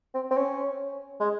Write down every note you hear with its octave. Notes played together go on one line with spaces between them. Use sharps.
C4
C4
C#4
G#3